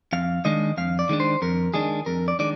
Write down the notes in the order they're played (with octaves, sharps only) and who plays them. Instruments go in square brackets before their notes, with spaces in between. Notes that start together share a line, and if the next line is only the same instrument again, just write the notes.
[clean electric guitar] F2 F5
D#3 G#3 D4 D#5
F2 F5
D5
D#3 G#3 D4
C5
F2 A#4
D#3 G#3 D4 G#4
F2 A#4
D5
D#3 G#3 D4 D5